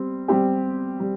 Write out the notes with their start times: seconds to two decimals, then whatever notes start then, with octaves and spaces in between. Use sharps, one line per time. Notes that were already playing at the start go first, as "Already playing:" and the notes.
Already playing: G3 C4
0.28 G3 C4 G4
1.00 G3